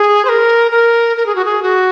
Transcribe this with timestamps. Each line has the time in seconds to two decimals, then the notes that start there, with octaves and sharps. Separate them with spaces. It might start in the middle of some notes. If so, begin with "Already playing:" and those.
Already playing: G#4
0.25 C5
0.29 A#4
0.72 A#4
1.17 A#4
1.26 G#4
1.35 F#4
1.45 G#4
1.63 F#4